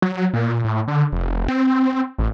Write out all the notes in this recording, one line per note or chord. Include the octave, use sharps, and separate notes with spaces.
F#3
A#2
A2
D3
F1
C4
A1